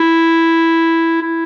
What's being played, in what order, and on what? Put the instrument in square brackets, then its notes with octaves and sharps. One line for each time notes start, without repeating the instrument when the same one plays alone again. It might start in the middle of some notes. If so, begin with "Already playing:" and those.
Already playing: [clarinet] E4
E4